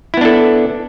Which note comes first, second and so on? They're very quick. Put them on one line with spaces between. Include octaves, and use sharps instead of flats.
E4 B3 D4 A4